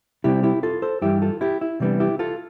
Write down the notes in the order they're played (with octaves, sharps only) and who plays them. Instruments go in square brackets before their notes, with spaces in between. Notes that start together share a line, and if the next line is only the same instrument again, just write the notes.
[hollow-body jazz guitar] C3 G3 C4 E4 G4
E4 G4
F4 A4
A4 C5
G2 E3 G3 E4 G4
F4 A4
E4 G4
E4
C3 E3 G3 B3 D4
E4 G4
F4 A4